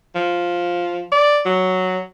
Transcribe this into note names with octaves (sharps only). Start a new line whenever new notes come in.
F3
D5
F#3